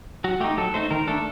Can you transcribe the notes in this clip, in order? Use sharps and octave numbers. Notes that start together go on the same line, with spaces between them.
F#3 F#4
A3 D#4 G4
F#3 A4
A3 D#4 C5
D#3 A#4
A3 D4 A4